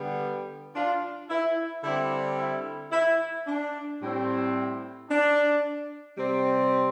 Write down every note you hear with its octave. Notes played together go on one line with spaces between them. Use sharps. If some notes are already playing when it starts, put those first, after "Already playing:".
Already playing: D3 G3 B3
D4 F4
E4
D3 G3 C4 E4
E4
E4
D4
A2 G3 C4
D4
C3 G3 C4